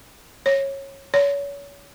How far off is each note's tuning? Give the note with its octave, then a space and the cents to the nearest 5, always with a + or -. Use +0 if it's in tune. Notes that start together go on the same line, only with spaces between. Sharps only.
C#5 -20
C#5 +35